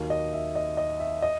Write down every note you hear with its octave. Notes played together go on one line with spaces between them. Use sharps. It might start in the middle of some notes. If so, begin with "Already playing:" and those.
Already playing: D#2 D#3 F#3
D#5
E5
D#5
D#5
E5
D#5